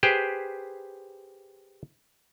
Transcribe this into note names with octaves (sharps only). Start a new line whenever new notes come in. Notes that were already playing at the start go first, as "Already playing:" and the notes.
G4 G#4 B4 C5 G5